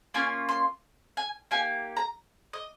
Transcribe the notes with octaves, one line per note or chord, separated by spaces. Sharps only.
A#3 C#4 F4 G#5
C6
G#5
A#3 D#4 G4 G#5
A#5
D#5